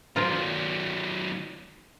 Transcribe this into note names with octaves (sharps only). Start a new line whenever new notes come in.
D#3 F#3 F4 A#4 C5